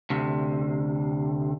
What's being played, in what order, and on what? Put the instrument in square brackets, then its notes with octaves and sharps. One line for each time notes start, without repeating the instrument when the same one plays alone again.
[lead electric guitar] D2 C3